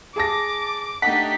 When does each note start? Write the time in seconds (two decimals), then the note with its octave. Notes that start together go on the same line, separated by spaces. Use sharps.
0.16 G#4 A5 D6 A#6
1.02 A3 D4 D#4 G4 D#5 F#5 B6